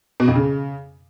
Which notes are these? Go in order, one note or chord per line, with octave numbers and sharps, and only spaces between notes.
B2
F2
C#3